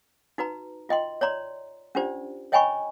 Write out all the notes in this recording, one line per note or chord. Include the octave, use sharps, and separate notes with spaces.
D#4 F#4 B4 A#5
F4 D#5 G5 C6
C#5 D5 A#5 C6
C#4 D4 F4 G4 C5 D5
C#5 D#5 G5 G#5 B5 C#6